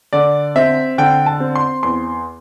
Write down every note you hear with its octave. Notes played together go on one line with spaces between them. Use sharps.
D3 D5
C4 E5
D3 G5
A5
C4
C6
E2 C6